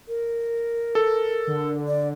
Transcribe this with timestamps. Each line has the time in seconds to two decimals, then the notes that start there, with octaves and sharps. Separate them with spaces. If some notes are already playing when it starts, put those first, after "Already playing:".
0.08 A#4
0.95 A4
1.47 D3
1.88 D5